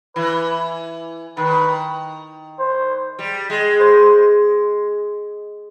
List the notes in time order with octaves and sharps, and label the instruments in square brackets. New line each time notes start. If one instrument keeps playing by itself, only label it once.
[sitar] E3 [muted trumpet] B4
[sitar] D#3 [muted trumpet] B4
[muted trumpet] C5
[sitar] G3
G#3
[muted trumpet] C5